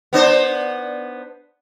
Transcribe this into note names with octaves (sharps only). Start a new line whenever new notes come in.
B3 D4 C5